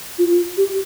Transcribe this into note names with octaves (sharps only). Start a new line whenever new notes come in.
F4
G4